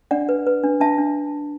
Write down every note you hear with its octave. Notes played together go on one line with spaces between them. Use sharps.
D4 D5 F#5
B4
B4
D4
D4 E5 A5
D4